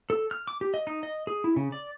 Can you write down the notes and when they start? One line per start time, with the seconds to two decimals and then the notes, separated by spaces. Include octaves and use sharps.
0.10 A4
0.31 F6
0.47 D6
0.61 G4
0.74 D#5
0.87 D#4
1.03 D#5
1.27 G#4
1.44 E4
1.56 C#3
1.72 D5